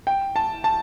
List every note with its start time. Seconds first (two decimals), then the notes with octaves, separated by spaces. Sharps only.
0.07 G5
0.36 A5
0.64 A5